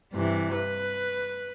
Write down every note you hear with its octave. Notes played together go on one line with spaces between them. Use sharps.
G2 C3 E3
B4